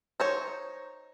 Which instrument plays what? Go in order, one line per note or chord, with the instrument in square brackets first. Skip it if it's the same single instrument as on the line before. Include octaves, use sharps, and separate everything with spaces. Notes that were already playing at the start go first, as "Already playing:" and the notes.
[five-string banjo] D#4 C5 C#5